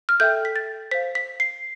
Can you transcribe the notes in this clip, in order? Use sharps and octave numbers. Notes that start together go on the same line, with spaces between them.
F6
A4 E5 G5 G6
B6
A6
C5 F5 B6
B6
C7